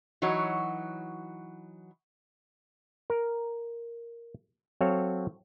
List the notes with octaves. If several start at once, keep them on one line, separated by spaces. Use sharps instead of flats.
E3 F#3 D#4 F#4 C#5
A#4
F#3 C4 A4 C#5 F5